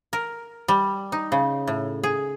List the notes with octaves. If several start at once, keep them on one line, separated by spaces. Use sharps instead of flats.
A#4
G3
D#4
C#3
A2
G#4